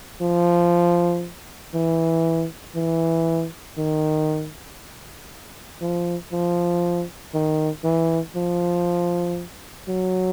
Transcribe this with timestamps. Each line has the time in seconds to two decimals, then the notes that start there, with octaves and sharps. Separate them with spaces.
0.22 F3
1.75 E3
2.76 E3
3.78 D#3
5.81 F3
6.33 F3
7.34 D#3
7.84 E3
8.36 F3
9.88 F#3